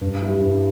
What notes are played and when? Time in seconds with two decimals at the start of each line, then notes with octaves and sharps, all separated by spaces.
0.01 G2
0.22 G3 E4
0.41 G2